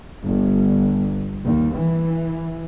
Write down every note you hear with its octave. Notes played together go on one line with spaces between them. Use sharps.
G1
D#2
E3